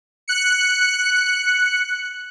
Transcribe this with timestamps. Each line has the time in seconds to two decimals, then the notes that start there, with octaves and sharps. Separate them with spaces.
0.28 F#6 C#7